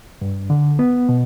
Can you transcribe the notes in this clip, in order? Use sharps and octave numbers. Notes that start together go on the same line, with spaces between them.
G2
D3
B3
B2